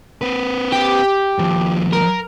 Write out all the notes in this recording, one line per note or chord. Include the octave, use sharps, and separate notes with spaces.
C4 B4
G4
D#2 F3
A#4